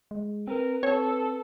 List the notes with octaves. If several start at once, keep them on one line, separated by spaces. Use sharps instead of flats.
G#3
C4 A#4 B4
C4 A4 C#5